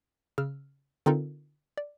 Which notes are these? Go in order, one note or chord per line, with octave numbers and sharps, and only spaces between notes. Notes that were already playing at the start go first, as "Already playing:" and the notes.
C#3 E6 F6
D3 C4 D#4 F4 A4 A#4
D5